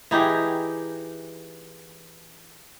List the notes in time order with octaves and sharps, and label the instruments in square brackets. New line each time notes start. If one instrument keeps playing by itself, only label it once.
[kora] E3 D#4 G4 G#4